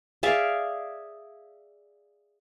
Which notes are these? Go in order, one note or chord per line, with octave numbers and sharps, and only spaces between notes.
G#4 D5 E5 F5